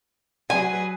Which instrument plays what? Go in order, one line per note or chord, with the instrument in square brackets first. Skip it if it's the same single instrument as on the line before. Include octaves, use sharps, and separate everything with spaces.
[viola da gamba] F#3 G#4 B4 [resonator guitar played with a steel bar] G#5